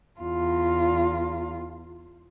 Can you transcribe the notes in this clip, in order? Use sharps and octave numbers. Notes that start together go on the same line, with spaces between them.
E2 F4